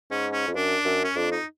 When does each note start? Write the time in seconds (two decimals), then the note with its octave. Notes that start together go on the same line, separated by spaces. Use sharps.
0.11 G#2 C#4
0.32 C#4
0.47 F2
0.55 F#2 D4
0.85 F#2
1.04 C#4
1.15 F2 D4
1.32 D#4